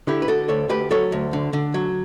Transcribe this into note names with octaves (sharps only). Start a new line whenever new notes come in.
D3 E4 G4
B4
D3 F#4 A4
D2 A4 C#5
D2 G4 B4
F#3 A4 C#5
D2
D3
D3
F#3